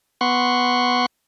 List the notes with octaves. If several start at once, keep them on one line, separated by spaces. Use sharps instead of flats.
B3 F#5 C6 C#6